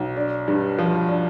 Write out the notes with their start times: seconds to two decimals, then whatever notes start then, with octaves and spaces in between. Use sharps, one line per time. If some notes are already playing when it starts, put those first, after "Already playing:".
Already playing: B1
0.16 D4
0.48 G2
0.79 F3
1.09 D4